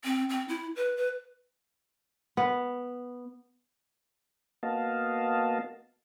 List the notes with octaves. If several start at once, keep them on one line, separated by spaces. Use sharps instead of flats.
C4
C4
E4
B4
B4
B3
A#3 B3 F#4 D#5 F5 A5